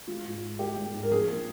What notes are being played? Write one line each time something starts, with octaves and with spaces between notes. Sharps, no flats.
G#3 F4
G#2
G#2
G#3 G4
G#3
G#2
A#4
F3 G#4
A#2